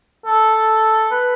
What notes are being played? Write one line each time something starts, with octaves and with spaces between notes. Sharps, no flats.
A4
B4